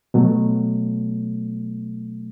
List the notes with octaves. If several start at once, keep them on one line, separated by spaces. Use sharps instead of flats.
B2 F#3 A3